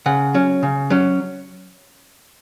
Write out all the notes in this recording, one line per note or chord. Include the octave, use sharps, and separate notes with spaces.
C#3 F#5
F#3 C#4
C#3
F#3 C#4